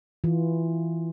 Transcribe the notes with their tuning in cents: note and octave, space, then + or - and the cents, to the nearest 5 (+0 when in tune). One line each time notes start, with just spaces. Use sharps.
E3 +0 F4 +0